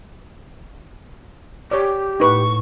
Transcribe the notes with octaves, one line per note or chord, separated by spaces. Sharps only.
G4 C#5 D5
A2 D#4 B4 C#6